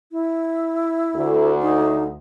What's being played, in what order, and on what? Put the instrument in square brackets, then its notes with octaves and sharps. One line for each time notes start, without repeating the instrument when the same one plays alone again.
[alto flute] E4
[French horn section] D2
[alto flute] D#4